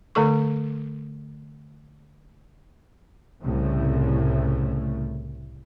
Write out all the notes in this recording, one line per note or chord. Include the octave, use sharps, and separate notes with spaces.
D3 A3 A4 C#6
C2 A2 C#3 A3